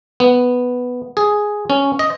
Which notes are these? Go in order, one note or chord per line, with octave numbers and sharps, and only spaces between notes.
B3
G#4
C#4
D#5